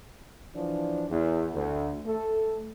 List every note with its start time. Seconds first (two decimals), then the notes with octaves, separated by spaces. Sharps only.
0.56 E3 F3 D4
1.10 E2
1.54 D2
2.06 A3 A4